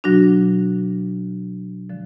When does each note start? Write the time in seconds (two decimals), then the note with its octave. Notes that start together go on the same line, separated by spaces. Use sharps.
0.04 B2 F#3 D4 F#4
1.90 D3 F3 G#3